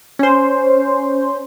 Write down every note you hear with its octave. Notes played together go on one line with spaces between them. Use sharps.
C#4 C5